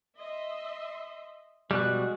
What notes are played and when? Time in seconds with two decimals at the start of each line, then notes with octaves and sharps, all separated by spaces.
0.17 D#5 E5 C6
1.71 B2 F3 G3 G#3 F#4 F#6